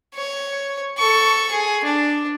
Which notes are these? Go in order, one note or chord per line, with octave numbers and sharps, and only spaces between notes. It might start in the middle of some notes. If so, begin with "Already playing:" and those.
C#5
A4 C#6
G#4
D4